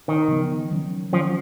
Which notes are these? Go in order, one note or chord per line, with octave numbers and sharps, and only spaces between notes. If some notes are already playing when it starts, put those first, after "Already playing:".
D#3
C#3 F3 B3
D#3 F#3 C#4
D#3 F3 F#3 C#4